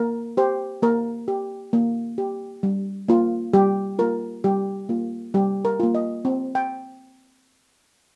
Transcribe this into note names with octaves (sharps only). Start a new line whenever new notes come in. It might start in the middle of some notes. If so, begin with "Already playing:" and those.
Already playing: A#3 A#4
G4 C5
A#3 A#4
G4
A#3
G4
G3
A#3 F4
G3 G4
A#3 F4 A#4
G3 G4
A#3 F4
G3 G4
A#4
A#3 F4
D#5
C4
G5